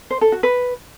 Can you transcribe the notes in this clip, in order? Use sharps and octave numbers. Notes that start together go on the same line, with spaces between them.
C5
A4
F#4
B4